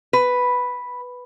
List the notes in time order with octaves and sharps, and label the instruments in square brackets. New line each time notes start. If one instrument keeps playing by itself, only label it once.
[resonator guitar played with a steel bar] B4